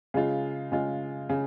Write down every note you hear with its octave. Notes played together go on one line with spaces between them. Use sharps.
C#3 G#3 F4
C#3 G#3 F4
C#3